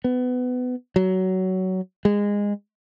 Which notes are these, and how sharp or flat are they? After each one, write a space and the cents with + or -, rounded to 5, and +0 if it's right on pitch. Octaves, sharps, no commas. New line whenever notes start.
B3 +20
F#3 +15
G#3 -20